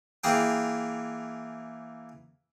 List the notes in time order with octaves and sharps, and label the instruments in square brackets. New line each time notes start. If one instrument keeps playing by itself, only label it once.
[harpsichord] E3 A#3 G#4 G5